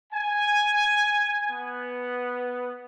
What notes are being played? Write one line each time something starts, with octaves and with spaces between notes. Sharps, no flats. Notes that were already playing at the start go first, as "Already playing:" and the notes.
G#5
B3